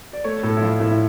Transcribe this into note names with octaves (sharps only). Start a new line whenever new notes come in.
D5
A3 C#5
A2 A4
E4
F3 F4
A2 E4
E4